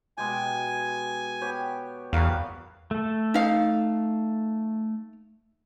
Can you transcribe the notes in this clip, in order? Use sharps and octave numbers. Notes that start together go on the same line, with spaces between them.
B2 G#3 G4 G#5
B3 G4 C#5
E2 G3 F#4 A#4 F5
A3 A4
D#4 F5